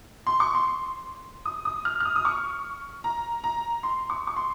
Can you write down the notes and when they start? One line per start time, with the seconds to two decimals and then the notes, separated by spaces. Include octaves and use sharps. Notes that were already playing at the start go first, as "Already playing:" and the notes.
0.27 C6
0.40 C#6
0.55 C6
1.45 D#6
1.65 D#6
1.85 F6
2.00 F6
2.05 D#6
2.16 D#6
2.25 C#6
3.04 A#5
3.44 A#5
3.83 C6
4.10 C#6
4.27 C#6
4.36 C6